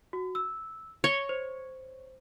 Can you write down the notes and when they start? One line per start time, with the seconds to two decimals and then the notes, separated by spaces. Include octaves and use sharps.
0.13 F#4
0.35 E6
1.04 C#5 A#6 F7 G7
1.29 C5